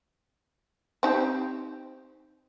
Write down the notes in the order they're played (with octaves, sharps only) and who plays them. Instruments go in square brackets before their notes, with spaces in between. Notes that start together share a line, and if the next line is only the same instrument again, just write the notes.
[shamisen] C4 D#4 G4